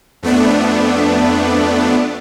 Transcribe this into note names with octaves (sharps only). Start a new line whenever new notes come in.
F2 A3 B3 D4